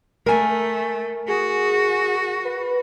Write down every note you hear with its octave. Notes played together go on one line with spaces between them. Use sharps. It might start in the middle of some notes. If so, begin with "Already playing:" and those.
A3 A#4 G#5
F#4 G#4
B4